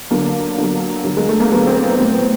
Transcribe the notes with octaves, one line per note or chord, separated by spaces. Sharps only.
D3 F#3 A#3
D3 F#3
D3 F#3
G#3
A3
A#3
D3 F#3 B3
C4
B3
A2 F#3 C4
B3